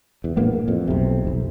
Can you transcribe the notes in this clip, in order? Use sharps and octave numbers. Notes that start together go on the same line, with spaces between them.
E2
A#1 A2 A#3 B3
F2
B1 C3
F1 B1